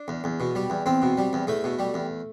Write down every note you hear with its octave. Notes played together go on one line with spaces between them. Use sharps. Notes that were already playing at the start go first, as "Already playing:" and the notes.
Already playing: D4
E2
E2
B2
G3
E2
E2 C4
B2
G3
E2
E2 A3
B2
G3
E2